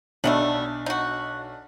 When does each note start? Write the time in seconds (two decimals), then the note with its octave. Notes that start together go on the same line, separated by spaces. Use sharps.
0.24 B1 F#3 G3 A3 D4 E5
0.86 D#4 F#4